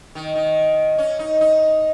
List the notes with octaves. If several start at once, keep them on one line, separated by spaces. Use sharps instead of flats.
D#3
D#3
C#4
D#4
D#4